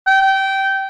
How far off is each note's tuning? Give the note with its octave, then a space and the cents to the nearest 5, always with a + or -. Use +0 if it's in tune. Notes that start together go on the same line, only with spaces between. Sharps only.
G5 -20